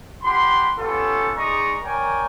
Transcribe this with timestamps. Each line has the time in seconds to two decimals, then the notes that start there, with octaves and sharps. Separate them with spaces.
0.23 F4 G4 F#5 B5 C6
0.78 B3 C#4 F4 G4 A4
1.35 G#3 D#4 D5 A#5 C#6 D#6
1.82 A#4 C#5 D5 G5 G#5 A#5